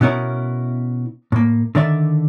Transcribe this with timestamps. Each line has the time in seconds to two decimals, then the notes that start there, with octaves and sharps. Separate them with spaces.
0.01 B2 B3 C#4 E4 A#4
1.32 A2 A#3
1.75 D3 D#3 D5 E5